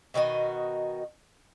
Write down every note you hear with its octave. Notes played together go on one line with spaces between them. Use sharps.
B2 D#3 F#4 D#5